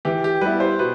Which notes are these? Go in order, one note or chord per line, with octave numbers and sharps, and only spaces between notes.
E3 G4
G4
G3 B3 E4 B4
C5
B2 B4